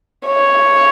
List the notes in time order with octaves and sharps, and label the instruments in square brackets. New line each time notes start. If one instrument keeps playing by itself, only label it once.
[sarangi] C#5